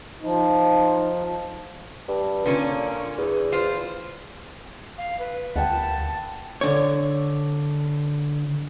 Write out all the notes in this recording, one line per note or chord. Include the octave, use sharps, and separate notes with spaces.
F3 D#4
G2
A#2 D3 C#4
E2
F4 C5
F5
B4
D2 F#5 G5 A5 B5
D3 C#5